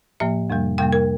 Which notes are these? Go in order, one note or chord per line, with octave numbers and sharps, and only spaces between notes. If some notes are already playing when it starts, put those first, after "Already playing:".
A2 F3 A#3 E5
F2 C3 G3 A#3
F2 C3 G3 A#3 G5
A#4